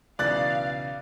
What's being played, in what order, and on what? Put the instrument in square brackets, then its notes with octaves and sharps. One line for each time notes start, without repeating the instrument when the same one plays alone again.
[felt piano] B1 C#3 E3 [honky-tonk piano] D5 F#6 A6 [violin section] F5